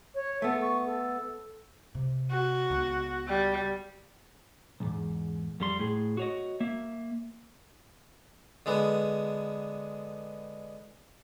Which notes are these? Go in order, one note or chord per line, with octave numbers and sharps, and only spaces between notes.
C#5
A3 B3 A4
C#6
A4
C3
F#4
C#2 B3
G3
B1 E2 G#2
F2 G3 C6
A2 G#4
F#4 C#5 D#5
A#3 E5
D3 G#3 B3